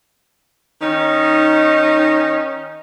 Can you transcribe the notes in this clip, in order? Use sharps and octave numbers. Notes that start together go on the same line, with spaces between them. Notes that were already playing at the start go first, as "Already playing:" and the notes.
D#3 C#4 D#4